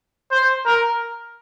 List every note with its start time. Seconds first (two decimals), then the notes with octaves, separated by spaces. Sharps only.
0.31 C5
0.65 A#4